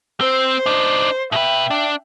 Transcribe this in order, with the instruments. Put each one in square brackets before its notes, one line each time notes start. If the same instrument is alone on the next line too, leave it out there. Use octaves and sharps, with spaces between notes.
[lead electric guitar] C4 [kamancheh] C5
[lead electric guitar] D4 D#4
[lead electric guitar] B2 B4 [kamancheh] E5 G5
[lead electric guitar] D4